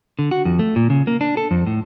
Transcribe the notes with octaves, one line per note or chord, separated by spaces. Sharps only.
D3
F#4
F2
A3
A#2
C#3
A#3
D4
A4
F2
A2